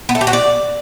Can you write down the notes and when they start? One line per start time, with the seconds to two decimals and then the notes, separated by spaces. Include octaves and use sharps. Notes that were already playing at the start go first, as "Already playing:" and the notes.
0.09 B3
0.15 A3
0.21 G4
0.27 F#4
0.33 D5